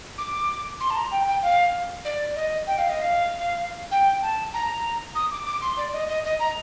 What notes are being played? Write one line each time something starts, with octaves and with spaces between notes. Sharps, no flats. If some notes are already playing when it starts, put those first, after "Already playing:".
D6
C6
A5
A#5
G5
G5
F5
D5
D#5
G5
F5
D#5
F5
G5
A5
A#5
D#6
D6
D6
C6
D5
D#5
D#5
D#5
A#5